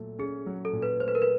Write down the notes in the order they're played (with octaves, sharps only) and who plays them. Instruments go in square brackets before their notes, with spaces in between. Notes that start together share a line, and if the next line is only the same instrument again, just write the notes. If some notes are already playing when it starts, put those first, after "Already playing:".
Already playing: [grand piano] A#2 F#3 A3
[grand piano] C#4 [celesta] G#4
[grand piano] F#3
[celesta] A4
[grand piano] A#2
[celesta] B4
[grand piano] A3 [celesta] C5
[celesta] B4
A#4
B4